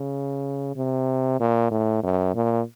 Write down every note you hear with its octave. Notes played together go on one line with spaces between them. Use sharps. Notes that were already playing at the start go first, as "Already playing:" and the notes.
Already playing: C#3
C3
A#2
A2
F#2
A#2